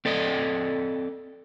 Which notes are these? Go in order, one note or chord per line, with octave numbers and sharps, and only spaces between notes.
C4 A4 D5 D#5